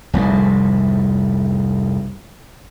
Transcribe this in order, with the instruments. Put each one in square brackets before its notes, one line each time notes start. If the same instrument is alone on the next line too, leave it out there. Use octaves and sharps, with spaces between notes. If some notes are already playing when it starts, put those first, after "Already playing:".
[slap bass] F1 C2 G#2